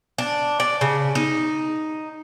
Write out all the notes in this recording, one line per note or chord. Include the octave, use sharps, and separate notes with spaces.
D4
D5
C#3
D#4